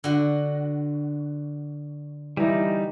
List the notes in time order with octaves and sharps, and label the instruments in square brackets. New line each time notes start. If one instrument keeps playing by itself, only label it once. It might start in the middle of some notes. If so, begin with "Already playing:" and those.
[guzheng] D3 F#4
[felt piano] E3 E4 [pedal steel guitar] G3 D#4